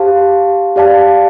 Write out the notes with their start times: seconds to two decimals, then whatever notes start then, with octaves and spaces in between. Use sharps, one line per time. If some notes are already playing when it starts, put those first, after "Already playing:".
Already playing: G4 C5 F5 A5
0.76 G4 D5 F5 A5